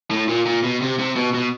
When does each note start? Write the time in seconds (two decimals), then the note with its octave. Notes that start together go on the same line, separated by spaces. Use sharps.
0.11 A2
0.29 A#2
0.46 A#2
0.64 B2
0.82 C3
0.99 C3
1.16 B2
1.34 B2